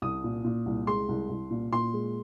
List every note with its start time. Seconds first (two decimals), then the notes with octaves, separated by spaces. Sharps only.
0.02 C2 D#6
0.24 A#2
0.44 A#2
0.66 C2
0.87 G#3 C6
1.09 C2
1.29 C2
1.50 A#2
1.72 A#2 C6
1.93 G#3